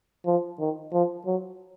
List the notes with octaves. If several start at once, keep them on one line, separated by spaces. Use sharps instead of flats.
F3
D#3
F3
F#3